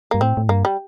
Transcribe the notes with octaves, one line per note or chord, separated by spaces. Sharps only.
G2 A#3
A2 C4
A2
G2 A#3
G3